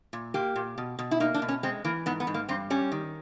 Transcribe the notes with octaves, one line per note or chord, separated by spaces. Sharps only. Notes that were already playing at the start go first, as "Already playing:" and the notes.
A#2
A#3 G4
A#2
B2
B2
E4
A#3 D#4
D4
B2
C#4
G#3 C4
E3 A#3
G#2 B3
B3
G#2
A#3
G2 C4
G3 C#4
D#3